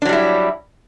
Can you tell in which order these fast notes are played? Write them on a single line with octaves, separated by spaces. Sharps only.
D4 F#3 G3 E4